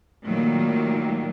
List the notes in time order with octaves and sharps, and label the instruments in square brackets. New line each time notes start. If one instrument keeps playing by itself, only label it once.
[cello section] A#2 D#3 F#3 G3 A3 A#3